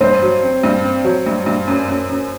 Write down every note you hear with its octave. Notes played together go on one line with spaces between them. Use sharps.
G2 C5
F#3
C4
G2
C4
F#3
G2
G2
F#2
F#2
F#2